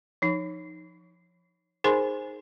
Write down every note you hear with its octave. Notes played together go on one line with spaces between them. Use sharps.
F3 D#4
D#4 G#4 A#4 C5 G#5 C6